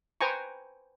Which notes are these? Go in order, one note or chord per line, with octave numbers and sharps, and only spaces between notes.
B4 C5 G5 G#5 A#5 C#6